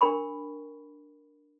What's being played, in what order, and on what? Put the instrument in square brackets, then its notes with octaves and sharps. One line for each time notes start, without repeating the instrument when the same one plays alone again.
[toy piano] D4 A#4 G5 B5 C#6